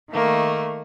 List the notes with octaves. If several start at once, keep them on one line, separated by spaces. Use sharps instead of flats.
D#3 A3 A#3